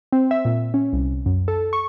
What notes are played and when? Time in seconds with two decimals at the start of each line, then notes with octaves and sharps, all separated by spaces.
0.12 C4
0.31 E5
0.45 A#2
0.74 C#4
0.93 C2
1.26 F#2
1.48 A4
1.73 C#6